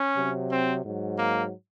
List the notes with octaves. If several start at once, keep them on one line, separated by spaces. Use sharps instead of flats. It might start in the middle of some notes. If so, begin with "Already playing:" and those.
Already playing: C#4
C3 F#3
C4
G#2 F#3
A#3